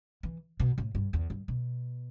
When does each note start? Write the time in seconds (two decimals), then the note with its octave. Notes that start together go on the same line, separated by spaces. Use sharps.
0.23 E3
0.60 B2
0.78 A2
0.95 G2
1.13 E2
1.30 G2
1.48 B2